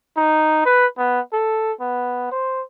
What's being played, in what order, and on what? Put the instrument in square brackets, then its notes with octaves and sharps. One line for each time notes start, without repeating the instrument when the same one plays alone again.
[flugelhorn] D#4
B4
B3
A4
B3
C5